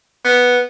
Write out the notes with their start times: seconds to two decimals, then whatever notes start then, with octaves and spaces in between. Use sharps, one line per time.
0.25 B3